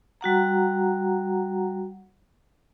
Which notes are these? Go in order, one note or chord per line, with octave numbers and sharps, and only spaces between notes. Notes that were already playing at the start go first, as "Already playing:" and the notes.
G3 F#4 F#5 A#5